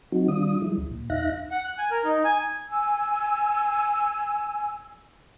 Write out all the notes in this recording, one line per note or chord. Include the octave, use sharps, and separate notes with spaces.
F#3 C4 D#4 F#4
D#3 G3 D4 F4 D#6
F3 G3 G#3 E4
D2
A#2
E2 D#4 E5 F5 F#6 A#6
F#5
F#6
G#5
A#4
D#4
G#5
G#5 E6